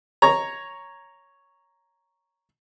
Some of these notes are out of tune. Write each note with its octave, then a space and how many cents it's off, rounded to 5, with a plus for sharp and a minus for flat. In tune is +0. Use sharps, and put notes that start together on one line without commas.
C#5 +0 A#5 +0